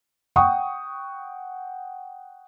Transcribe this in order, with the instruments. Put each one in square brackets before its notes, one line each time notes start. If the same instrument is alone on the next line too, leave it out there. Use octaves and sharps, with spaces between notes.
[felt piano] F#5 G5 C#6 D#6